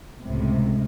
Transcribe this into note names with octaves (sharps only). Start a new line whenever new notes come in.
C#2 A2 C3